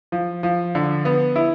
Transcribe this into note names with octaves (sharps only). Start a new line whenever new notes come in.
F3
F3
D3
B3
E4